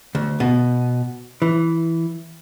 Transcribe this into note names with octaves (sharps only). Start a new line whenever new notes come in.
D2
B2
E3